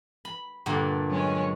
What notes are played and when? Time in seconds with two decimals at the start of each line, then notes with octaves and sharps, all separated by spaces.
0.25 B5
0.66 G2 A#2 D3
1.08 F#3 G#3 C#4